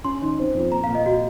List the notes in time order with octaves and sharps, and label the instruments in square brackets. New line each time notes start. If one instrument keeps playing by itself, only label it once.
[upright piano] C#4 [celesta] C6
[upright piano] D#3
C4
F2
[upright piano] A#2 [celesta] A#5
[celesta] F5
[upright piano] A#2
[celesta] D#5
F#4